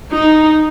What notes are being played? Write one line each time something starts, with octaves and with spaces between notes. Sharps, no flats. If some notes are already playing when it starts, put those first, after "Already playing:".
D#4